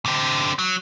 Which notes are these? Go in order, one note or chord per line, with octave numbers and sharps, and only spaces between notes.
D3 C4
F#3